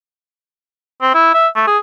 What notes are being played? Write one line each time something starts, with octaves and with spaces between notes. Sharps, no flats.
C4
E4
E5
A3
G#4